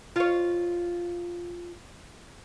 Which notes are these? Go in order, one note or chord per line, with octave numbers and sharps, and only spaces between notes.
F4 C#5